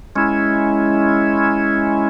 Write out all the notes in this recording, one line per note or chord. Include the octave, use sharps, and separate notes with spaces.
G#3 C#4 E4